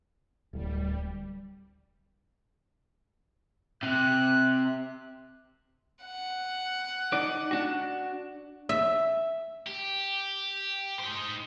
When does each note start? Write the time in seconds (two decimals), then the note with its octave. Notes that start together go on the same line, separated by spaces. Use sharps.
0.53 D1 G3
3.83 C3 F#6
6.05 F#5
7.12 D#4 D5
7.51 D4 F#4
8.69 E5
9.67 G4
10.99 D#4 C5